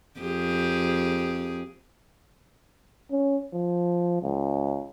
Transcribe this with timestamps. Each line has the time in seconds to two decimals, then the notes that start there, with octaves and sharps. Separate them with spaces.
0.20 F2 G4 G#4
3.11 C#4
3.53 F3
4.22 C#2